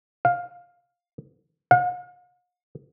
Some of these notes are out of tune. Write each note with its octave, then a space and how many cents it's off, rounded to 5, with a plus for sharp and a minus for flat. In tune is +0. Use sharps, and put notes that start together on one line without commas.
F5 +10
F5 +45